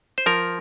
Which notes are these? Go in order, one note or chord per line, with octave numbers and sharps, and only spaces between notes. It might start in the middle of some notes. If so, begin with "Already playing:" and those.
C5
F3 A#4